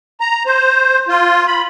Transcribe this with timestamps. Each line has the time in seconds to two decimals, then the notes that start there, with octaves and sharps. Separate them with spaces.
0.20 A#5
0.46 C5
1.09 F4
1.47 B5